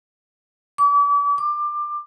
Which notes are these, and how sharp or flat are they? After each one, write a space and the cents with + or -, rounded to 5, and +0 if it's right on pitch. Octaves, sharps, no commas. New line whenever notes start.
D6 -40
D6 +20